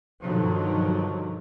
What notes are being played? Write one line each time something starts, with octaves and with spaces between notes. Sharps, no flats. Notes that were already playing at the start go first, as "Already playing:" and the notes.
G2 B2 D3 D#3 F3 F#3